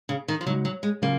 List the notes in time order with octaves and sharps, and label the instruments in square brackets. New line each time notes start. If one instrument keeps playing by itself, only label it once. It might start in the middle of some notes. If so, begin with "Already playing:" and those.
[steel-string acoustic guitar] C#3
D#3
F3
[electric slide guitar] C#3 G#3 D#4 F#4 [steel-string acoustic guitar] F#3
[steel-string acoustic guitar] F#3
G#3
[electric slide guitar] C#3 F#3 C#4 F4 G#4 [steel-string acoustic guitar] A#3